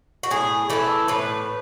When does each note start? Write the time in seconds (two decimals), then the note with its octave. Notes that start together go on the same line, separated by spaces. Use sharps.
0.23 F#4
0.31 A2 G#4
0.70 E3 A3 A4
1.08 A2 B4